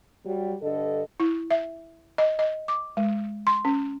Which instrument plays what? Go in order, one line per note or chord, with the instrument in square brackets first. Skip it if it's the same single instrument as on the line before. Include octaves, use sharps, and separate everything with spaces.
[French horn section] F#3 G3
G2 D3 A4 D#5
[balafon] E4
E5
D#5
D#5
D6
G#3
C6
C#4